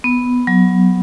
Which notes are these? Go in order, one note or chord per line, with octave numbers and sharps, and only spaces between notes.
B3
F#3